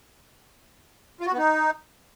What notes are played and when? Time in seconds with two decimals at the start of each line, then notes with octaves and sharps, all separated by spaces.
1.21 F4
1.26 F#4
1.32 B3
1.38 D#4